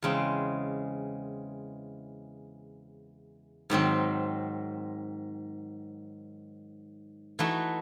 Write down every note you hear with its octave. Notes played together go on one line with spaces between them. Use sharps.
E2 C#3 G#3 C4
G#2 D#3 F#3 C4 D#4
E3 A3 D#4 F#4